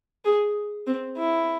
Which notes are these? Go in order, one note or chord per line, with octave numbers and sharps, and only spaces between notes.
G#4
C4
E4